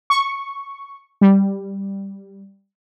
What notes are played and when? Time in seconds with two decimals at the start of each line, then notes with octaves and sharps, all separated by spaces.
0.10 C#6
1.21 G3